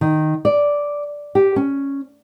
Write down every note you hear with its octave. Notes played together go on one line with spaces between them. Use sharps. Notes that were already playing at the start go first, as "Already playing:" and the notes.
D#3
D5
G4
C#4